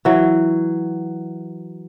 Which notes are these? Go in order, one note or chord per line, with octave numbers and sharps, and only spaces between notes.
E3 F#3